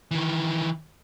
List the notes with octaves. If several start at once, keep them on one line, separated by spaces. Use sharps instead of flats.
D#3 E3